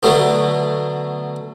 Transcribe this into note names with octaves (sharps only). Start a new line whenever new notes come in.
B2 D3 F#3 A3 B3